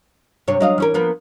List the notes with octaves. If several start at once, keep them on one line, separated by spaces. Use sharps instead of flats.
G2 C3 C#5
F#3 D#5 F5
E3 C#4 A#4
F3 A#3 B3